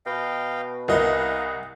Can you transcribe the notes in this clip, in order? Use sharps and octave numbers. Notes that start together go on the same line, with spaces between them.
B2 D#5 F5 G5
C2 A#4 B4 D#5 F5 A#5